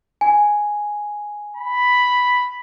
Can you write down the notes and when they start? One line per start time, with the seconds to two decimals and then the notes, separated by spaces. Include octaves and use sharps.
0.21 G#5
1.56 B5